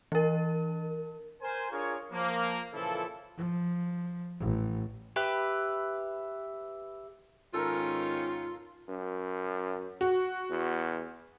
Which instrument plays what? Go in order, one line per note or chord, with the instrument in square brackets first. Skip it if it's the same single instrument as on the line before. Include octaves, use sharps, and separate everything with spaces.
[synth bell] E3 A#4
[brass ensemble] A#4 C5 G#5
D4 F4 G#4 A#4 C#5
F3 A#3
A#2 C#3 E3 F3 E4 A4
[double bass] F3
A1
[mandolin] G4 B4 E5
[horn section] G#2 D#3 C#4 [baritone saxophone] F4 [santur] A4 A#4
[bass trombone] F#2
[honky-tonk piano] F#4
[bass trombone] E2